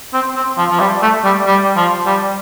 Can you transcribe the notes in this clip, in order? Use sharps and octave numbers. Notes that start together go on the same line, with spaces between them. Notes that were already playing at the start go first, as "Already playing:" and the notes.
C4
C4
F3
F3
G3
A3
G3
G3
F3
G3